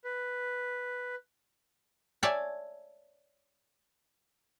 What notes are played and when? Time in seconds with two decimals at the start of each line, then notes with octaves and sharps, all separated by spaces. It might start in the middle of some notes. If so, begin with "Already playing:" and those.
0.04 B4
2.23 C#5 D5 E5 G#5 A5